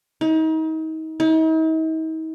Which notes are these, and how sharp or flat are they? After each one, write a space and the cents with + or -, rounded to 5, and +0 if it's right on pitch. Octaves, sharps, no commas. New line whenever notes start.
D#4 +35
D#4 +45